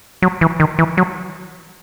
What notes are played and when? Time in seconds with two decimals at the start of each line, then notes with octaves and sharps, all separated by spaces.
0.22 F#3
0.41 E3
0.60 D#3
0.79 E3
0.97 F#3